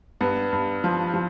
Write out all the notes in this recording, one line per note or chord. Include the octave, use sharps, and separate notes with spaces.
G2 B3
G2
F3
F3